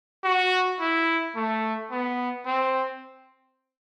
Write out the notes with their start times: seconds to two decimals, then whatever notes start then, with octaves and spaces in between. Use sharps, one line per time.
0.24 F#4
0.80 E4
1.36 A3
1.91 B3
2.46 C4